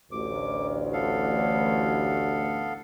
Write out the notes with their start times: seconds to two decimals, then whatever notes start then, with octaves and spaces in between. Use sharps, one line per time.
0.12 A1 D2 D6
0.93 B3 A4 F5